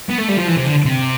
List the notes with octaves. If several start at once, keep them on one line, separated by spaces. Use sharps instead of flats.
B3
A3
G3
F3
E3
C3
D3
C3